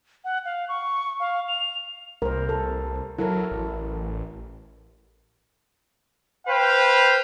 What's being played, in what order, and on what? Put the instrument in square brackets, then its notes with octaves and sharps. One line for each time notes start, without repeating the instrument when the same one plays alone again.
[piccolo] F#5
F5
C#6
F5
F7
[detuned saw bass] C2 [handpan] A#4 C5
[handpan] A4
[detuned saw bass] F#3 [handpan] E4 A4 A#4
[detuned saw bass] A1
[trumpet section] B4 C5 F5 G5